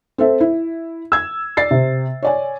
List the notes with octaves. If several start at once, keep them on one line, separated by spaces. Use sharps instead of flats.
C4 A4 E5
E4
E6 G#6
D5 A6 C7
C3
C#5 D5 G#5